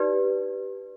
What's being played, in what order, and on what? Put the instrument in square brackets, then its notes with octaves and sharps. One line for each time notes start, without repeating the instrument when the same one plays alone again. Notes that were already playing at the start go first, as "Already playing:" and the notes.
Already playing: [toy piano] D#4 G4 B4 D5